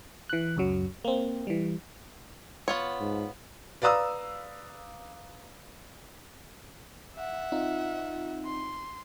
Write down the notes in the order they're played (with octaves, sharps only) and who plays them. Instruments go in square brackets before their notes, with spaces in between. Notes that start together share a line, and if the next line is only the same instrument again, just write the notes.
[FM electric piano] E3 F#6
C#2 F#2 F#3
A#3 C4
E3 G3
[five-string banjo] B3 F4 C#5
[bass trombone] G#2
[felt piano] B4 D5 F5 A#5 D#6 E6
[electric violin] E5 F#5
[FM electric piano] C4 D#4 F4
[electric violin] C6